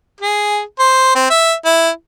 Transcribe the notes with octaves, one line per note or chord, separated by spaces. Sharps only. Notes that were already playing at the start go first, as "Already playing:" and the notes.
G#4
C5
C4
E5
E4